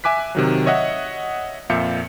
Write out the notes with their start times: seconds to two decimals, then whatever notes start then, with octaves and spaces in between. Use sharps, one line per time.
0.04 E5 G#5 D6 F#6 B6
0.35 C3 D#3 F#3
0.66 C#5 D#5 E5 F#5
1.70 F2 A#2 E5 F5 G6 C#7